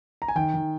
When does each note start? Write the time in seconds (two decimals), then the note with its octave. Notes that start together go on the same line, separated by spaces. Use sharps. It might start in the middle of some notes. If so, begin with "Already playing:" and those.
0.22 A#5
0.28 G#5
0.35 D#3 G5
0.54 D#3